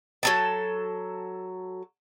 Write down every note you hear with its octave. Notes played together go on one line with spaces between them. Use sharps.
F#3 A4 A5